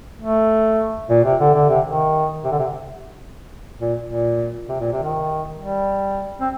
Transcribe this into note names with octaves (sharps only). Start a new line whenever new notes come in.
A3
A#2
C3
D3
D3
C3
D#3
C3
D3
C3
A#2
A#2
C3
A#2
C3
D#3
G3
C4